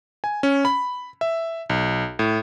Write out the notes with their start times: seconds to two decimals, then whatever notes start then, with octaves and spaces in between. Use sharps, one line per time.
0.24 G#5
0.43 C#4
0.65 B5
1.21 E5
1.69 B1
2.19 A2